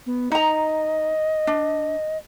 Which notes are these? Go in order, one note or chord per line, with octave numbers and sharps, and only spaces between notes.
B3
D#4 D#5 A#5
D4